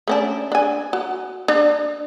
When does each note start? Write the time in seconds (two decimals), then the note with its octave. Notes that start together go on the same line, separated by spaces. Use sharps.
0.08 A3 C#4 D4
0.52 D4 G#5
0.93 F#4
1.48 D4